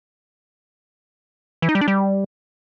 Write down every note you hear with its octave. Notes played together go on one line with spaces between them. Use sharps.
E3
D#4
G3
D4
G3